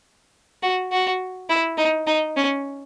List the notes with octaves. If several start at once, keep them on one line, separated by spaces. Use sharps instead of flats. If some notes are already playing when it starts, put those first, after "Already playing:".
F#4
F#4
E4
D#4
D#4
C#4